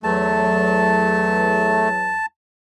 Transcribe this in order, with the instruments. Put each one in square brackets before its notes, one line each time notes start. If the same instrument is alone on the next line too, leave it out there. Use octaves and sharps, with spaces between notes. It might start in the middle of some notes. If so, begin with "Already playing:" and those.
[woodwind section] E2 F#3 [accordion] A3 [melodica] A5